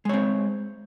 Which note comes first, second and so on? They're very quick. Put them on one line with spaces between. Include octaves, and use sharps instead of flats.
G#3 C#5 C4